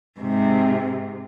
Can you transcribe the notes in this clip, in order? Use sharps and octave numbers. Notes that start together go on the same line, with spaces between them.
G#2 C3